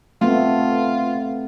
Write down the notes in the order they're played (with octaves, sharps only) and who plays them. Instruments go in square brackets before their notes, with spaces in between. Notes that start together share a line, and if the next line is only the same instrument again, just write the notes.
[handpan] A3 B3 C4 [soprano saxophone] F4